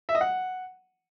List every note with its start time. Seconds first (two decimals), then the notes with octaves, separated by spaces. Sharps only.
0.09 E5
0.15 D#5
0.21 F#5